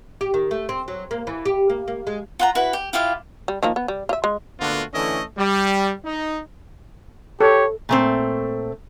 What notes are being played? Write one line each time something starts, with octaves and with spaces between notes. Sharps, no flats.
G4
D#3
A3
C4
F#3
A#3
E3
G4
A#3
A#3
G#3
F4 F#5 A#5
E4 F#4 B4
G4
E4 F4 G4 F5
G3
D#3 F3 A#3
B3
G3
F4 E5
G#3
A#2 D3 A3 B3 F4 F#4
D3 E3 A3 C#4 E4 D#5
G3
D#4
G4 A4 C#5
A#2 A3 C4